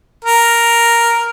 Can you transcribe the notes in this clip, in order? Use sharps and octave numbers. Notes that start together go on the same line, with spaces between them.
A#4